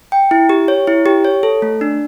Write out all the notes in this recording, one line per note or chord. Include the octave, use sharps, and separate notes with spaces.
G5
E4
G4
C#5
E4
G4
C#5
A4
A3
D4